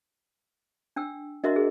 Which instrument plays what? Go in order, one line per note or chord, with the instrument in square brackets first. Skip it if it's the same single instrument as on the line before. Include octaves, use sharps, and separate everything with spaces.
[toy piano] D4 G5 E6
[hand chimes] D4 F#4 A#4 [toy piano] D#5 E5 C6
[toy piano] G#4